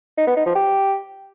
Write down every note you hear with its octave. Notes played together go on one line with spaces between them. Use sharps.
D#4
B3
D#4
F3
G4